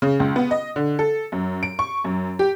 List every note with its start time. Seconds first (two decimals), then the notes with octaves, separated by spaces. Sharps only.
0.02 C#3
0.20 C#2
0.36 B3
0.51 D#5
0.76 D3
0.99 A4
1.32 F#2
1.63 D7
1.79 C#6
2.04 F#2
2.39 G4